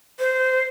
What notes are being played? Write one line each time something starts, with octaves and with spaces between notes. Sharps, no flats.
C5